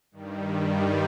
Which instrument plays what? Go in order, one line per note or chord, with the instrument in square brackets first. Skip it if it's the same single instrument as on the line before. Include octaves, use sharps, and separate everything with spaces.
[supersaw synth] G2 D#3 G3